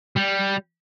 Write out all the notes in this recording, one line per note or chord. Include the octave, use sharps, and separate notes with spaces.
G3